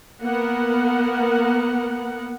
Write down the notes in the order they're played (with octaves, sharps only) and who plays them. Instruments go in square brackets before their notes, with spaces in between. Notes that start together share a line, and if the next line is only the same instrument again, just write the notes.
[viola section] A#3 B3 A#4 F#5